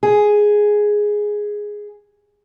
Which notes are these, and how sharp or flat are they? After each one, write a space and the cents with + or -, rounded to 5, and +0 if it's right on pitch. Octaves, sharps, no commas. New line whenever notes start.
G#4 +0